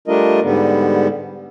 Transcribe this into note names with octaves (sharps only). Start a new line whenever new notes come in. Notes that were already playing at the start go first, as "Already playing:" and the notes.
G3 A3 D4 F4 A#4 D#5
G#2 D3 G3 B3